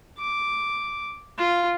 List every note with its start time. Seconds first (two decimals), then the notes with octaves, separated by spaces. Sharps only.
0.18 D6
1.38 F4